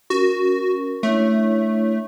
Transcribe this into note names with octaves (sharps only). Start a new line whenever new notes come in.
C#4 F#4 A#4
A3 D4 E4 C#5